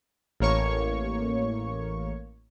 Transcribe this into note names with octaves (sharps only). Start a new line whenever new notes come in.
A1 A#3 C#5 C#6